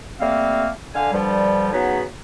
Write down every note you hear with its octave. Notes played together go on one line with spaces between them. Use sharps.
G3 A3 A#3 C4 F5
D3 F5 G#5
G2 D3 F3 G3
C#3 F#3 B3 D#4 G#4 B4